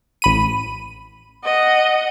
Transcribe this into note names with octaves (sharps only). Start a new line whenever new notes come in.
A1 B5 D#7
D#5 F#5